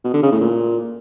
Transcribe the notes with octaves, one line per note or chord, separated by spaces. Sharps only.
B2
D3
C#3
A2
A#2